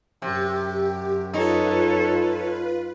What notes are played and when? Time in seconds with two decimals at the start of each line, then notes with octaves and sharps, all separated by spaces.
0.22 F#2 C3 G4
1.33 D#4 F4 A4 B4 C#5